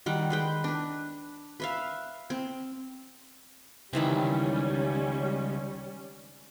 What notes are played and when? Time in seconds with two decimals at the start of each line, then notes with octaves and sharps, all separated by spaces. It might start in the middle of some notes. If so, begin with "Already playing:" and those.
0.06 D#3 G3 F#5
0.30 G#3 B4 G5
0.64 D4 B4
1.60 B4 E5 F5
2.30 C4
3.93 C#2 D#3 E3 G3 C4 C#4